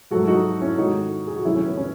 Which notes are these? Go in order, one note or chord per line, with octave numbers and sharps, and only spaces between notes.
G#2 F#3 A3 F#4 A4
D#4 F#4
C#4 E4
G#2 D#3 A3 D#4 F#4
G#4
F#4
F#2 D#3 F#3 A3 C#4 E4
C#4
B3
C#4